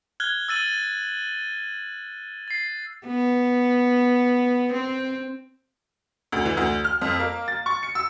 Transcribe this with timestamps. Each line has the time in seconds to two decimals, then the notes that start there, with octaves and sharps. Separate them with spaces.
0.20 F6 F#6 G#6 G7
0.48 E6 A6 D#7 F#7 G7
2.48 A6 C7
3.07 B3
4.73 C4
6.32 D2
6.45 E3
6.57 D2
6.84 F6
7.01 F2
7.20 A#3
7.48 A6
7.66 C#6
7.83 C#7
7.95 E6